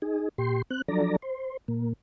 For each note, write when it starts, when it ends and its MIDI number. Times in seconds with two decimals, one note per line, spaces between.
0.02 0.29 63
0.02 0.29 68
0.38 0.62 46
0.38 0.62 67
0.38 0.62 84
0.70 0.82 60
0.70 0.82 90
0.88 1.16 53
0.88 1.16 54
0.88 1.16 62
0.88 1.16 69
0.88 1.16 74
0.88 1.16 82
1.22 1.57 72
1.68 1.93 46
1.68 1.93 58